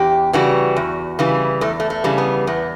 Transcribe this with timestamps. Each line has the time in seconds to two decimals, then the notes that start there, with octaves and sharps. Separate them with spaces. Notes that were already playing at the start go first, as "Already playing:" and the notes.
Already playing: E2 G4
0.33 C#3 E3 G3 F#4
0.76 E2
1.19 C#3 E3 G3
1.61 E2 A3
1.80 A3
1.90 A3
2.04 C#3 E3 G3
2.18 B3
2.47 E2 B3